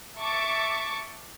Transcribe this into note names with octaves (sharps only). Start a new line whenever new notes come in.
E5 A5 C#6 D6